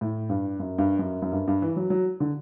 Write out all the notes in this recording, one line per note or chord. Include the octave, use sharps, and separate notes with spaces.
A2
G2
F#2
G2
F#2
F#2
G2
G2
E3
F#3
F#3
D3